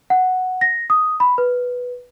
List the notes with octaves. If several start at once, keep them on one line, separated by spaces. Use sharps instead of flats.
F#5
A#6
D#6
B5
B4